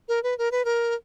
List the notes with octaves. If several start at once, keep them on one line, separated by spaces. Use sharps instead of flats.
A#4
B4
A#4
B4
A#4